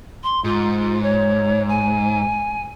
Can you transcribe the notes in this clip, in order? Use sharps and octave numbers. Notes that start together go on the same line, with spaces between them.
C6
G#2 F4
C#5
G#5